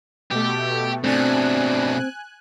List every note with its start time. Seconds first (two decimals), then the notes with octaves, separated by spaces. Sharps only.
0.31 B2 A3 G4
1.04 B2 A3 C4 D4 G#5 F#6